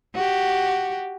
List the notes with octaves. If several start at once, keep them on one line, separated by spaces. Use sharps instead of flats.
F#4 G4